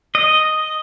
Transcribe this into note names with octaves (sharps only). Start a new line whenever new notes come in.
D#5